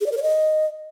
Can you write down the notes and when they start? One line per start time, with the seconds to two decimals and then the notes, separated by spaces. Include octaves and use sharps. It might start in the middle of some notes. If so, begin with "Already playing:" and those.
0.01 G#4
0.06 D5
0.12 A#4
0.17 C#5
0.23 D#5